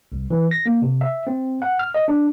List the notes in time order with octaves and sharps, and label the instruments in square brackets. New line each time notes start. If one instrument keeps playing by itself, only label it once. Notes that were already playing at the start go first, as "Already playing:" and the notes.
[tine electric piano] C2
E3
A#6
A#3
C3
E5
C4
F#5
F6
D#5
D4